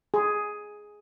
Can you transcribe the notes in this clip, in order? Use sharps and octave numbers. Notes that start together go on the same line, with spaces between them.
G#4